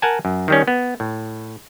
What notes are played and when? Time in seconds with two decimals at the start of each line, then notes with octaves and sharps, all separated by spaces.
0.02 A#4 F#5 G#5 A5
0.25 F#2
0.48 D#3 G3 C#4
0.68 B3
1.00 A2